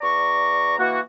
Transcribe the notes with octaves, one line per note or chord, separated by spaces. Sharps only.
E2 D5 A#5 C#6
E3 A#3 F#4